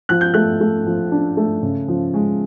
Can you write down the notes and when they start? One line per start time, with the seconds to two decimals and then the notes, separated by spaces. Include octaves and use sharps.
0.09 F3 F#6
0.21 G6
0.34 A3 F#6
0.61 A3
0.86 F3
1.12 D4
1.37 A3
1.63 C#3
1.88 F3
2.14 G#3